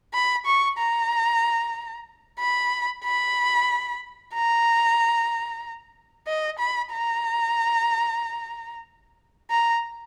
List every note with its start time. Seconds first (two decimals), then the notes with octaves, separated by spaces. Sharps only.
0.14 B5
0.45 C#6
0.78 A#5
2.40 B5
3.04 B5
4.34 A#5
6.27 D#5
6.59 B5
6.92 A#5
9.50 A#5